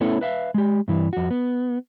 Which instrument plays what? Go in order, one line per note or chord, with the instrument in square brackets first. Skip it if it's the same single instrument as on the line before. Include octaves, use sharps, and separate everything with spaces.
[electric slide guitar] A3 B3 C#4 E4 A4
B4 E5 F5
G#3 G4
G2 E3
F2 F#4
B3